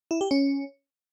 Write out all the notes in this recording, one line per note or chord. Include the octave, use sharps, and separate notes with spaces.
E4
G4
C#4